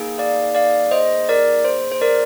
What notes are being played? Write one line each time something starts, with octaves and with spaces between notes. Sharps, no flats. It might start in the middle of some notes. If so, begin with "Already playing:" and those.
Already playing: A#3 D#4 G#4
D5 F5
D5 F5
C5 D#5
A#4 D5
C5
C5
A#4 D5